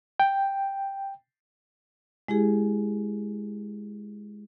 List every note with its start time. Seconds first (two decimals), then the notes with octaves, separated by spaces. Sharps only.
0.20 G5
2.28 G#3 E4 G4 G#4